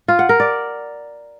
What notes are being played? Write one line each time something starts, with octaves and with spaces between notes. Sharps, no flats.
F4
F#5
A#4
D5